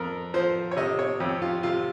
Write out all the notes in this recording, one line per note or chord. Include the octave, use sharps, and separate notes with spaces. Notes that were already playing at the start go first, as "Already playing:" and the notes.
Already playing: F2 A#4
F3 C5
C#5
C3 D#5
C#5
F2 G4
F4
C3 F4